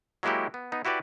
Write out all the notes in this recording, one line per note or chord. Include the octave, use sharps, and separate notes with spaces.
F#3 G#3 A#3 E4 F#4 G4
B3
B3 D#4
E4 F#4 G4 B4 D5